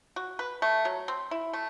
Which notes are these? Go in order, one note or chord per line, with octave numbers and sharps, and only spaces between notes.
F#4
B4
A3
F#3
C4
E4
A3